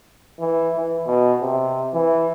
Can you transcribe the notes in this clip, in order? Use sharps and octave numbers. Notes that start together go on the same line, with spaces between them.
E3
E3
B2
C3
E3